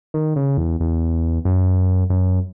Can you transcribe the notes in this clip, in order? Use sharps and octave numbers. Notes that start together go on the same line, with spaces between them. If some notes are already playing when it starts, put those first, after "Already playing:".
D#3
C#3
E2
E2
F#2
F#2